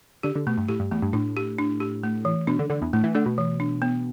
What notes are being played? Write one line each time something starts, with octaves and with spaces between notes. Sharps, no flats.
D3 G4
D3
B2 A3
G2
A2 G4
G2
E2 A3
G2
A2 D4
G4
D4
G4
A3
E3
B2 D4
D3
D3 D4
E2
A2 A3
E3
D3 A3
B2
E3
D4
B3